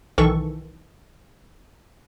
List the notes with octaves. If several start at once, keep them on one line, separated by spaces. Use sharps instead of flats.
B1 D#3 E3 A4 C#6